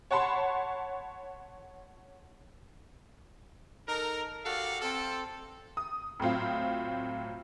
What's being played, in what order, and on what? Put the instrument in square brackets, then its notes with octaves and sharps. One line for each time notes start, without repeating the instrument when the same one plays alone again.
[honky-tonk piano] C#5 F#5 A5 B5 C6
[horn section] D#4 A4 A#4
F#4 G4 A4 D5 F5
C4 A4
[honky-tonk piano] D#6
A2 F#3 C4 F4